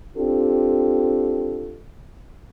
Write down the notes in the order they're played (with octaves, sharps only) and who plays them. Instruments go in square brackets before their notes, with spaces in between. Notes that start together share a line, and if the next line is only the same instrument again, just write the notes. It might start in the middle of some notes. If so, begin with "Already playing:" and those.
[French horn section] C4 D4 F4 G4 A4